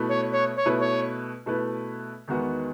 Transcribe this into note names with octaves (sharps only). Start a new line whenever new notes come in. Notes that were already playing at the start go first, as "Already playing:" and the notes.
Already playing: B2 A3 E4 B4
C#5
C#5
C#5
B2 A3 E4 B4
C#5
B2 A3 E4 B4
E2 D#3 G#3 B3 F#4